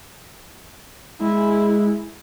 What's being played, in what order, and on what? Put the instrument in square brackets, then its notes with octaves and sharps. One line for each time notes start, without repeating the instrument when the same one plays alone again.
[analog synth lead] G#3 [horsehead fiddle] E4